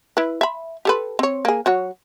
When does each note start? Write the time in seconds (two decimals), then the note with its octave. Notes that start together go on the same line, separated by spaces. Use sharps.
0.17 E4 B4
0.41 E5 B5
0.85 G4 A4 B4
1.19 C4 C#5
1.45 A#3 G#4
1.66 F#3 F#4 C#5